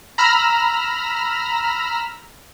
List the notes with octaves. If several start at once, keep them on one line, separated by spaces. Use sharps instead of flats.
A#5 B5 E6 F6 A#6